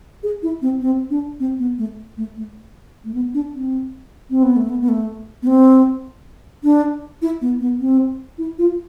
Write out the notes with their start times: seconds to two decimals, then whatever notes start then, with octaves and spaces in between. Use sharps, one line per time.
0.23 G#4
0.43 E4
0.62 C4
0.81 C4
1.10 D4
1.40 C4
1.59 B3
1.78 A3
2.17 A3
2.36 A3
3.04 A3
3.14 B3
3.34 D4
3.53 C4
4.30 C4
4.43 B3
4.56 A3
4.69 B3
4.81 B3
4.89 A3
5.42 B3
5.47 C4
6.64 D4
7.22 E4
7.41 B3
7.60 B3
7.80 C4
8.38 E4
8.58 F4